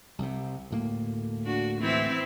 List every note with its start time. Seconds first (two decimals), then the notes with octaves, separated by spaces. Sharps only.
0.18 C2 C3
0.71 D2 A2 A#3
1.44 D4 F#4
1.80 E3 C4 E4